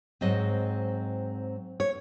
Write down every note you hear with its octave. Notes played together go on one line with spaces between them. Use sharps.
G#2 F#3 C4 D#5
C#5